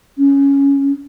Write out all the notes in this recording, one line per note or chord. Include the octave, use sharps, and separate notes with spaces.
C#4